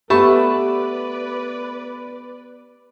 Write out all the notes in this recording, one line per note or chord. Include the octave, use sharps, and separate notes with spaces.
A3 B3 G4 B4 D5 A5 B5